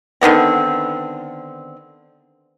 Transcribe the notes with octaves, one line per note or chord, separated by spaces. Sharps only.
D3 D#3 B3 C4